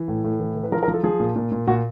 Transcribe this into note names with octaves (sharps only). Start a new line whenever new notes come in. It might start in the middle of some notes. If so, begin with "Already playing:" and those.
Already playing: E3
A2
A2
E3
E3
B4
F3 A#4
A#4
F3
A4
F3 G#4
A#2
A#2
A#2
A#2 F#4